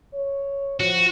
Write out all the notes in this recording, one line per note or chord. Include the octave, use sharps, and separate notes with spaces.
C#5
F3 F#4